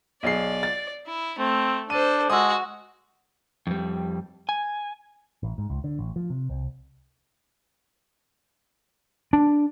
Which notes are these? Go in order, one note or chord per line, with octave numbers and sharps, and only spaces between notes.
B1 G#4 D5 C7
A6
E4
A3 C4
D4 A4 C5 D#7
G#3 F#4 D#6 E6
F2 G3
G#5
A1
G#2
C#2
D3
A1
F3
C3
C2
D4